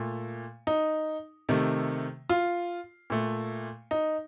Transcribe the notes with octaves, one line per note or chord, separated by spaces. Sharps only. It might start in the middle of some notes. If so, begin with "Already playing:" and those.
Already playing: A#2 A3
D#4
C3 D#3 A3
F4
A#2 A3
D#4